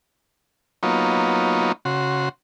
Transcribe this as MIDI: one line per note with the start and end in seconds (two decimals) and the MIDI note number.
0.83 1.72 54
0.83 1.72 58
0.83 1.72 59
0.83 1.72 63
0.83 1.72 65
0.83 1.72 73
1.85 2.29 49
1.85 2.29 66
1.85 2.29 84